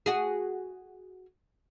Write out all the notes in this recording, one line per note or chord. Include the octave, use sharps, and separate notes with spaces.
F#4 G#4